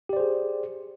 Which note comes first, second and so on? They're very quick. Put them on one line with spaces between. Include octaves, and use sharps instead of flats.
G4 D5 C5 G#4